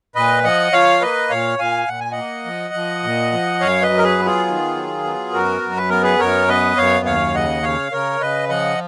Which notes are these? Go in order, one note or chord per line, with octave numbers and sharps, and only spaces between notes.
A#2 B4 D#5
F3 D#5 F#5
F3 C#5 F5
A#3 B4 D#5
A#2 C#5 F5
A#2 F5 G#5
A#2 F#5
G#5
D#5 F#5
A#3
F3
F3
A#2
F3
F#2 C#5 F5
B4 D#5
F#3
A#4
G#4 B4
B3
F4 G#4
D#3
F#3
B3
F#2 F#4 A#4
F#2
B4
B3 A#4
G#4 B4
F#2 A#4 C#5
B3 B4 D#5
F#2 C#5 F5
D#2 C#5 F5
C#3 D#5 F#5
C#3 C#5 F5
C#3 A#4 C#5
C#3 B4 D#5
F3 D#5 F#5